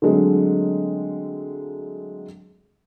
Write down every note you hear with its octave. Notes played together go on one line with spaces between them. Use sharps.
D3 F#3 G#3 A3 C4